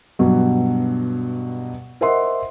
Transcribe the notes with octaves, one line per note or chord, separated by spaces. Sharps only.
G2 B2 F#3
A#4 C5 D#5 E5 F#5 C6